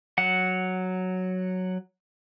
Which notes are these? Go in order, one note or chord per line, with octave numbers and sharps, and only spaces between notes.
F#3 F#5